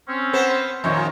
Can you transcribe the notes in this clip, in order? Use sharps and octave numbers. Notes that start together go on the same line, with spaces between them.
C4 C#4
B3 B4 C5
F2 A#2 D#3 C5 C#5